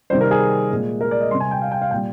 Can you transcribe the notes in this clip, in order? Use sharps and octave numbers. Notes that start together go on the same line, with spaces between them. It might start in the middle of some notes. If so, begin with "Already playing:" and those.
C3 D#3 G3 C5
A#4
G#4
A#2 G#3
A#4
D5
D#5
C3 G3 C6
G#5
G5
F5
G5
F5
A#2 G3 G5